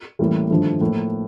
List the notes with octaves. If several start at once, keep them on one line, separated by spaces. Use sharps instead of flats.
A1 A2 E3 G3 A#3
G#1 G2 D3 F3 A3
A2 F3 A#3